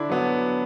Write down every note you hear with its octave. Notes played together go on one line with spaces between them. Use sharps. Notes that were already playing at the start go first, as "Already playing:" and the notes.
Already playing: D3 D4 E4
F#3 B3